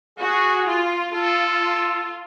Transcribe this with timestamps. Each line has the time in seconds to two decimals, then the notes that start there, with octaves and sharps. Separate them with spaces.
0.18 F#4 G#4
0.66 F4
1.12 F4 A4